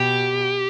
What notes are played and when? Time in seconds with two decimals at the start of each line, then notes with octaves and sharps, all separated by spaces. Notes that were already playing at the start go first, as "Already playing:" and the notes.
Already playing: B2 G4